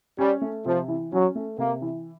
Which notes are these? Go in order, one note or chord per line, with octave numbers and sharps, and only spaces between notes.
G3 C#4
A3
C3 F3
E3
F#3 C#4
A3
C3 A#3
E3